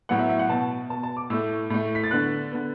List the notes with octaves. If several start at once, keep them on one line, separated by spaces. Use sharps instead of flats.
A2 F#3 B3 F#5
E5
E5
F#5
B2 B3 A5
B2 B3 A5
A5
D6
A2 A3 E6
A2 A3
B6
A6
D3 B3 F#6
D3 B3